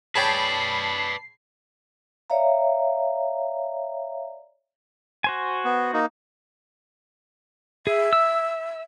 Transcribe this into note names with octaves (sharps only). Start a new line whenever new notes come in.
G#4 B4 C#5 D5 G5 A5 B5 C7
C#5 D5 E5 F5 A#5
F#4 C5 G#5
B3
A#3 D#4
G#4 E5
E6